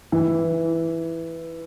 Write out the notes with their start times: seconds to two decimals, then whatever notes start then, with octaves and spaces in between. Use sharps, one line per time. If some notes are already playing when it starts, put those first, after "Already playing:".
0.12 E3